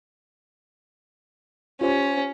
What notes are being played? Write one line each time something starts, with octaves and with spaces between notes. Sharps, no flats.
C#4 F4 G4 C5